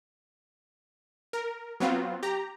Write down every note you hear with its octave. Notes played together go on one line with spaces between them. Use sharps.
A#4
F#3 B3 C4 F4
G4 A#5